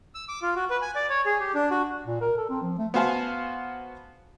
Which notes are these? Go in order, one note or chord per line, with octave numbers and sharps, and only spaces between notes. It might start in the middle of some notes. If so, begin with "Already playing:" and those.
E6
D6
F4
F#4
B4
G#5
D5
C#5
G#4
G4
D4
F#4
A#2
A#4
A4
C4
F3
A3
B3 F#4 C5 F5 G#5 A5